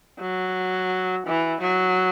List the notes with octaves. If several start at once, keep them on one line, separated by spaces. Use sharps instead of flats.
F#3
E3
F#3